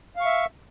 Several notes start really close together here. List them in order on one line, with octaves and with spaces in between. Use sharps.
F5 C#6 E5